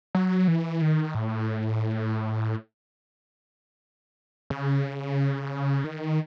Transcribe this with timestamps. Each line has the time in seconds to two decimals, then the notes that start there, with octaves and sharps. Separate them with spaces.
0.15 F#3
0.48 E3
0.82 D#3
1.15 A2
4.50 C#3
5.84 D#3